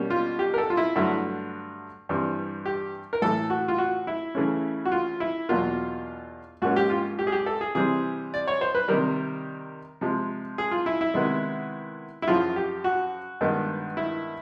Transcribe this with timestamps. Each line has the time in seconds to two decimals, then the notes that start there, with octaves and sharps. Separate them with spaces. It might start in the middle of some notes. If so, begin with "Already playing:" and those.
Already playing: B2 G3 A#3 C#4
0.10 F4
0.39 G4
0.54 A#4
0.58 A4
0.70 F4
0.77 E4
0.96 G2 D3 F#3 A3 E4
2.09 G2 E3 G3 C4
2.66 G4
3.13 A#4
3.22 A2 E3 A3 A4
3.50 F#4
3.68 F4
3.78 F#4
4.07 E4
4.35 C#3 E3 A3 C#4
4.85 F#4
4.92 F4
5.20 E4
5.49 E2 B2 F#3 A#3 F4
6.62 G#2 F3 A#3 C#4 F#4
6.76 G4
6.90 F4
7.19 G4
7.27 G#4
7.32 G4
7.46 A4
7.61 G#4
7.75 C3 E3 G3 C4 G#4
8.34 D5
8.47 C#5
8.61 C5
8.75 B4
8.88 C3 D#3 G3 A#4
10.01 C3 F3 G#3 C4
10.58 G#4
10.71 F4
10.86 E4
11.01 E4
11.14 C3 D#3 G#3 B3
12.22 E4
12.28 F#2 C#3 F3 F4
12.56 G4
12.84 F#4
13.41 G2 D#3 G#3 B3
13.97 E4